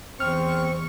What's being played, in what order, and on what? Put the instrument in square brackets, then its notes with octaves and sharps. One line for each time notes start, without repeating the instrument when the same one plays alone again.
[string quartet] E2 C#6 [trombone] C4 [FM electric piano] F6